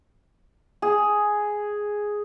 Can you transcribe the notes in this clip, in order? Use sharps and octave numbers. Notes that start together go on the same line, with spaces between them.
G#4